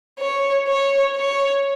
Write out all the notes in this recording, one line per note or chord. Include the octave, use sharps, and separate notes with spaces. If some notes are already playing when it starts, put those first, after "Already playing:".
C#5
C#5
C#5